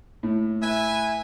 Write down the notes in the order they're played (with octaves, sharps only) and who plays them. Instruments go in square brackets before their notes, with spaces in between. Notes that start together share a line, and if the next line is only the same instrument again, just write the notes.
[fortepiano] A2
[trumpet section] B4 E5 G#5